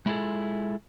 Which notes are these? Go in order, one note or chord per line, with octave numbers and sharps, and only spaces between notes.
G#3 E4 F4 G#4 A4